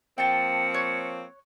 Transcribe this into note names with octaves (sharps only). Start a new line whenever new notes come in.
F3 A#3 C4 G5 A5 C#7
C#5 F#6